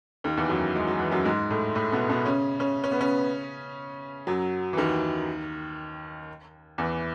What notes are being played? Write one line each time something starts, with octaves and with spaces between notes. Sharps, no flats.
D#2 D#3
E2 E3
F#2 F#3
G#3
F#3
E3
F#2 F#3
G#2 G#3
A2 A3
A2 A3
B2 B3
B2 B3
C#3 C#4
C#3 C#4
C#4
B3
C#3 C#4
F#2 F#3
E3
D#2 D#3
E2 E3